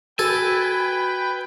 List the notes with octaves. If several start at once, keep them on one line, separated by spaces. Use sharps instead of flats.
F#4 A4 B4 G5 G#5